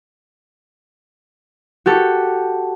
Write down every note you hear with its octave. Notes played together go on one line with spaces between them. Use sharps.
F#4 G4 A4